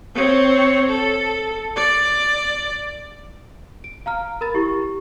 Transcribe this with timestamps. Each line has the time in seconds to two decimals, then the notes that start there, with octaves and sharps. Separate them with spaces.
0.15 C4 C#5
0.89 A4
1.76 D5
3.84 D7
4.06 F5 A#5 F6
4.41 A#4 B5 A6
4.54 E4 G4 C#6